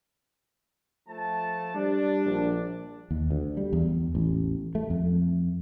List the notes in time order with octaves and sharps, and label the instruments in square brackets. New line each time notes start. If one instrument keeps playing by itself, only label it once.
[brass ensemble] F3 A3 A5
[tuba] G3 [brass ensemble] D4
[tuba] A#1
[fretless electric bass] D#2
D2
G3
E2
A1
A3
F2